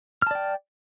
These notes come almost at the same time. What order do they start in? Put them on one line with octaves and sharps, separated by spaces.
F6 A5 D5 G5